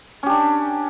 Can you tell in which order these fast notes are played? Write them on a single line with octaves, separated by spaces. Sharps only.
C#4 G4 D4